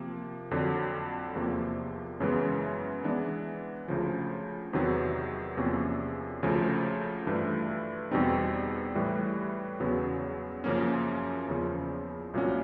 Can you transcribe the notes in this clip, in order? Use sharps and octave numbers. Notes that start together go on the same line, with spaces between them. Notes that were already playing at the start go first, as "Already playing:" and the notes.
Already playing: C3 F3 A#3
F2 D3 F#3
E2 C3 F3 A#3
F#2 C#3 E3 G#3 B3
E3 G#3 B3 D4
D2 C#3 F3
E2 C3 D#3 F#3 B3
E2 C3 F3 A#3 C#4
D2 C#3 F3 A3
G2 E3 A3 D4 F4
E2 B2 G3 C4 D#4
A2 E3 G3
E2 C#3 F#3 B3
F#2 C#3 F3 A#3 C#4
E2 C#3 F3
C2 A#2 F#3 A#3 C#4